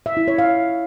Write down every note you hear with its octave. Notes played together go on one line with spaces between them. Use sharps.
E5
E4
C#5
F5